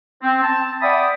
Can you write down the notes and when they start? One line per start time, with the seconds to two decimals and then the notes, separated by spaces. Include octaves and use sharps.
0.22 C4
0.42 A5
0.82 D5 E5 F#5 G5 B5 D#6